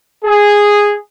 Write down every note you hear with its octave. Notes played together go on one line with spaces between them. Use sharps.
G#4